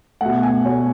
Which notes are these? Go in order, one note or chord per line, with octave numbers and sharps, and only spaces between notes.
B2 A3 F#5
G#5
B2 A3 C#5